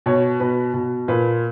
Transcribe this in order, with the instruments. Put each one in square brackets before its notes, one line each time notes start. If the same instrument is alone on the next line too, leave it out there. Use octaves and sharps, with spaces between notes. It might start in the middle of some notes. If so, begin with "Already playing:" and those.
[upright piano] B2 C#5
B2 B4
B2
A#2 B4